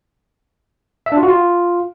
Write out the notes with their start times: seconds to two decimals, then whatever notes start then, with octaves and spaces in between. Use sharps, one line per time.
1.06 E5
1.12 D4
1.17 F4
1.23 F#4
1.28 F4